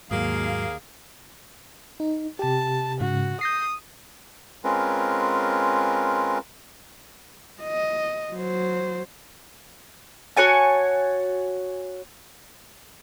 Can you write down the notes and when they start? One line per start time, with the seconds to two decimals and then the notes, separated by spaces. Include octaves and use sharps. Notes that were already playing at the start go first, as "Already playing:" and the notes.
0.11 D#2 G#2 F#3 A#3 G#4 F5
2.00 D#4
2.39 C3 G4 A5
3.01 G#2 C#3 F#4
3.41 D#6 G6 A#6 C7
4.64 G#3 C4 C#4 F4 A#4 B4
7.63 D#5
8.33 F#3 C5
10.37 F#4 C#5 G#5 A5